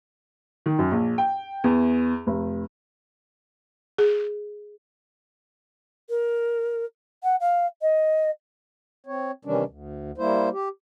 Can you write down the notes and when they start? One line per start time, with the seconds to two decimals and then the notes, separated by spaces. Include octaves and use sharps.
0.66 D#3
0.79 F#2
0.91 A#1
1.18 G5
1.64 E2
2.27 F1
3.98 G#4
6.09 A#4
7.23 F#5
7.40 F5
7.82 D#5
9.06 C4 C#5
9.45 C3 D#3 E3 G3 C#4 D4
9.67 D2
10.18 G3 A#3 E4 C5
10.52 G4